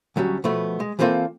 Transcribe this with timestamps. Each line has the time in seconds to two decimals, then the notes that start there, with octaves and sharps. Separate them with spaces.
0.16 D2 F#3 G3 C#4
0.44 B2 F3 A3 B3
0.80 G#3
0.99 E3 G3 A#3 C4 F4 A4